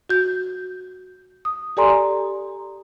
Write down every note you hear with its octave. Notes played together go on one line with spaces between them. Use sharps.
F#4 G6
D#6
G4 A4 D5 G#5 A#5 C6